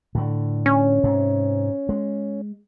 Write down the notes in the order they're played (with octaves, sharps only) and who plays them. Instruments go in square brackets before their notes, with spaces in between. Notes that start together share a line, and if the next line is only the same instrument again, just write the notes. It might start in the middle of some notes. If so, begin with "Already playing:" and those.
[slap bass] A2 D3
[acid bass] C#4
[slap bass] G#2 C3
G#3